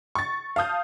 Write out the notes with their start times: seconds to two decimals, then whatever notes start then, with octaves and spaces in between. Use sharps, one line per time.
0.15 C#6 A6
0.56 F5 A5 D#6 G6